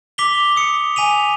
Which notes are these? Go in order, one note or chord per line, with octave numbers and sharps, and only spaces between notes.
D6 B6 F7 G7
D#6 C#7
G#5 B6 D#7 F7